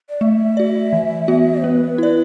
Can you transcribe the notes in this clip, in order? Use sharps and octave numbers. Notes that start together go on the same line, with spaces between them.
D5
A3 E5
F#4 D5
E3
B3 F#4
B3 B4
E4 D5